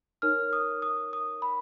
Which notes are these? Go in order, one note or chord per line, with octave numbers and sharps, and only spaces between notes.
D#4 A#4 C#5 F6
D#6
D#6
D#6
B5